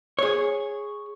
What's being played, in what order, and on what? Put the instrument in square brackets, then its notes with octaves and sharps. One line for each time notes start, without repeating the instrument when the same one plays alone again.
[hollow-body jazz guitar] G#4 C#5